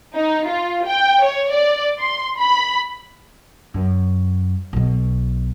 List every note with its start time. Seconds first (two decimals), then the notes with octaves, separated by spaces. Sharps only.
0.15 D#4
0.47 F4
0.86 G5
1.23 C#5
1.53 D5
2.00 C6
2.38 B5
3.74 F#2
4.73 B1 B2